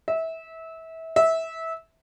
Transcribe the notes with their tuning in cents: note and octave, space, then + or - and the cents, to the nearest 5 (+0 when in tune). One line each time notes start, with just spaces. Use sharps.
E5 -25
E5 -20